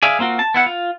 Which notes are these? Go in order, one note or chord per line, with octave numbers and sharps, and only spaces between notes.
G#4 D5 E5 F5
A#3 C4 F4 F#4
A5
B3 E4 F#5
F4